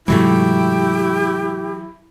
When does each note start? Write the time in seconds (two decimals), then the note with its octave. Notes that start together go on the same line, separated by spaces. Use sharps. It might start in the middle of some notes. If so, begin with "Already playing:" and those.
0.08 G#2 C3 E3 F#3 G#3 A3 E4 G4